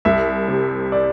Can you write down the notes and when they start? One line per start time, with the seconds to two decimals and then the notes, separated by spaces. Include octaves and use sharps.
0.05 C2 E5
0.48 C3
0.92 D5